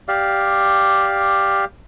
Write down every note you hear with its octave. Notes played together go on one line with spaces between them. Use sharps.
G4 D5 F5